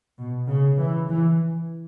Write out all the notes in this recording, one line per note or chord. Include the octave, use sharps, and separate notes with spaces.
B2
C#3
E3
E3